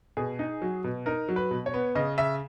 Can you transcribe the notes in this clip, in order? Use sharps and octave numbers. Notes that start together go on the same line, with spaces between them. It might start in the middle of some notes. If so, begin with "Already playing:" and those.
B2 G#4
D#4
F#3
B2
D#4 A#4
F#3
B4
B2
C#5
B3
C#3 D#5
C#3 E5